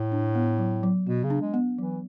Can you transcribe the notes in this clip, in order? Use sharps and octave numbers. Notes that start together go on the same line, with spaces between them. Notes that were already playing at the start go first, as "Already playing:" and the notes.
Already playing: A2
D4
B3
F#3
F#3
B2 B3
C#3
D4
G#3
B3
E3 F#3